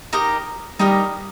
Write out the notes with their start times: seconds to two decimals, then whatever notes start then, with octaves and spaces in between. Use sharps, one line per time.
0.13 D#4 G4 A#4 D#5
0.79 G3 D#4 G4 A#4 D#5